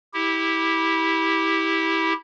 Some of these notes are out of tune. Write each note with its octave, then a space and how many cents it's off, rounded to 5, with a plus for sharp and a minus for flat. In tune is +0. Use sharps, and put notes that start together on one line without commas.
E4 -15 G4 +5